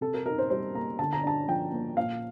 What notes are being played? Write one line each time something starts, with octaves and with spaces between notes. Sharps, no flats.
C3 A4
A#4
D#4 A#4
C5
G3 C5
A#3 A#5
D3 A5
A#5
D4 A5
F3 G5
A#3
A#2 F5